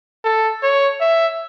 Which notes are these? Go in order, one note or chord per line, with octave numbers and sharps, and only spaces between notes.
A4
C#5
E5